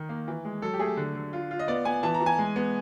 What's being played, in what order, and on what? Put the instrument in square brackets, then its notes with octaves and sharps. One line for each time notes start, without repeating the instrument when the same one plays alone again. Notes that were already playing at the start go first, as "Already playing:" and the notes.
Already playing: [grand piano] D#3
A#3
E3
G#3
F#3 A4
G4
A3 G#4
D3
D3
F4
F4
D#5
B3 D5
B3 G#5
E3 A5
A#5
E3
G#5
G#3
B3